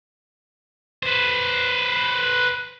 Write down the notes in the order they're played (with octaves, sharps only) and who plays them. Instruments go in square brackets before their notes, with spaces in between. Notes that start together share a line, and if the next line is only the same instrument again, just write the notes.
[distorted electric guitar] B4 C5